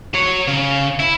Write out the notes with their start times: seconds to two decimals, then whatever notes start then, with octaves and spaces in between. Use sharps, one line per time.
0.14 F#3 C#5
0.48 C#3
1.00 E4